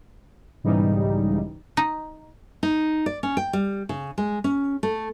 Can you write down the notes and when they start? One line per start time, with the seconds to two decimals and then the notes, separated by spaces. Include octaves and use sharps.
0.64 B1 G#2 C#3 E3 G3 D#4
1.77 D#4
2.63 D#4
3.06 D5
3.23 C#4
3.37 G5
3.53 G3
3.89 C#3
4.18 G#3
4.44 C#4
4.83 A3